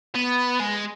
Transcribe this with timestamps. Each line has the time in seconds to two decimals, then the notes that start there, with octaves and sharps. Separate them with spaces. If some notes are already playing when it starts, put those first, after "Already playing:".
0.15 B3
0.60 G#3